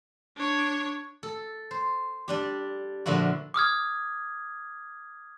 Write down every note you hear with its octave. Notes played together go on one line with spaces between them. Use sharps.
D4 C#5
A4
C5
G3 D4 G4
A#2 D3 F3 E4 F#4
D6 D#6 F6 G#6